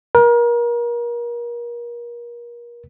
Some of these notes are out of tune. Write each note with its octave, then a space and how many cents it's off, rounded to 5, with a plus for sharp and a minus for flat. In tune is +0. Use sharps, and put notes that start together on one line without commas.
A#4 +35